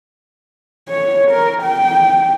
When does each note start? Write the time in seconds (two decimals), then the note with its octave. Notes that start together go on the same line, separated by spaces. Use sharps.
0.89 C#5
1.31 A#4
1.62 G5